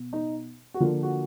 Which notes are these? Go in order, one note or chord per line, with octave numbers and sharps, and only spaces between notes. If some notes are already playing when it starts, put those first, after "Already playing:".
Already playing: B2 B3
D#4
F#4
D3 F3 A#3 F4
F#4